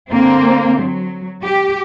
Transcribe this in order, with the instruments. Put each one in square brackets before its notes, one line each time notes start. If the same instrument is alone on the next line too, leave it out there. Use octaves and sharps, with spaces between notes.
[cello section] D3 A#3 C4 C5
F#3
G4